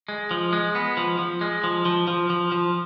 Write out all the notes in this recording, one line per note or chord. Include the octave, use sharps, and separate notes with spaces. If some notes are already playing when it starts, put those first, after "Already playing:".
G#3
F3
G#3
B3
F3
F3
G#3
F3
F3
F3
F3
F3